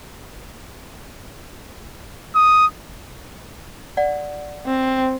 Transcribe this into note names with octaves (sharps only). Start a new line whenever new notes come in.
D#6
D5 F#5
C4